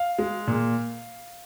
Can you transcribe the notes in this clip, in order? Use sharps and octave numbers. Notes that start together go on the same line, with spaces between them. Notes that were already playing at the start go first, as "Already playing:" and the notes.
Already playing: F5
G#3
A#2